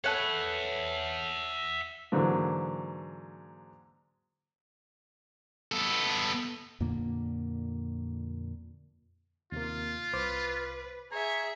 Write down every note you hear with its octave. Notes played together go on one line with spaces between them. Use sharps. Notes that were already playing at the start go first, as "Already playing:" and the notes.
A4 B4 C#5 E5 F#5
G#2 D3 E3 F#3 A#3
B3 A4
F2 A#2 D3 A#3
D#2 C3 A#3 F4
C2 B4 C5 D6
G#4 C#5 E5 A#5